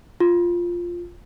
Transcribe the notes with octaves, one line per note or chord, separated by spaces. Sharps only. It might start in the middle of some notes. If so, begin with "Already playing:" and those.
F4